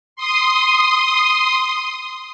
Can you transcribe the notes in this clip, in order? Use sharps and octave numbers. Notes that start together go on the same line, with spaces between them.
C6 D#6